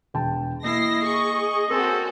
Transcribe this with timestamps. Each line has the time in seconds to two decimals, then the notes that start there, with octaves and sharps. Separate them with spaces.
0.14 E1 G5 A5
0.64 A#3 E4 D#5 A#6 C7
1.05 G#4 C#6
1.70 C4 C#4 F#4 A4 A#4